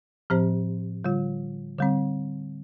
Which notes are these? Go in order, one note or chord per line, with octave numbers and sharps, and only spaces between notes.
A2 F3 C4 G4 C5
D3 G3 F4
D3 G3 C4